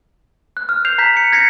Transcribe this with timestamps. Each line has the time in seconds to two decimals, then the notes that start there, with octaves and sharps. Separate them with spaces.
0.57 F#6
0.69 F6
0.85 G6 C7 F7
0.98 A#5 G6 B6
1.17 C#7
1.32 G#6 A#6 C7 C#7